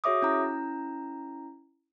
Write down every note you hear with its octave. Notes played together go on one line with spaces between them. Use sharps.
F#4 G#4 C#5 E5 D6 D#6
C#4 E4 A#5